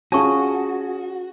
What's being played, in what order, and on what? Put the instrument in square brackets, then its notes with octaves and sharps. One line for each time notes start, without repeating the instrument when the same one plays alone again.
[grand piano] C#4 F4 G#4 [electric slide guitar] F#4 [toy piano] A5 C#6